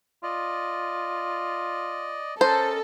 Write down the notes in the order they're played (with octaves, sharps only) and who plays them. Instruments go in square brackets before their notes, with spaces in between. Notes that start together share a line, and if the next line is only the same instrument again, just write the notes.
[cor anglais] F4 [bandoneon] D5 D#5
[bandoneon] C#4 A#4 D#5 [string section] A4 [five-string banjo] C5